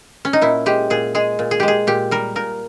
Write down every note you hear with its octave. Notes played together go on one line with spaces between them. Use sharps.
C#4
D#4
A#2 E4
G#3 G4
A#2 G#4
G#3 G#4
A#2
G#4
G#3 G4
G#4
A#2 G4
G3 A#4
A#2 A#4